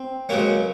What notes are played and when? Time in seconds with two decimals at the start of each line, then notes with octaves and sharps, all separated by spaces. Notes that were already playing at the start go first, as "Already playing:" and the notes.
Already playing: C4
0.29 C#2 C#3 F#3 A#3 C#4